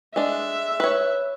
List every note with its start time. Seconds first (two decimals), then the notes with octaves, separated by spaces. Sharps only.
0.16 G#3 D4 E5
0.80 B4 C#5